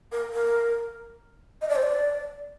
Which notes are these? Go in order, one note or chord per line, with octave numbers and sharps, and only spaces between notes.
A#4
A#4
D#5
D5
C5
D5